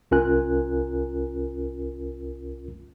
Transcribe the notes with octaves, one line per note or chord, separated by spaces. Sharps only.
C2 C#4 F4 A#4 G#5 F#6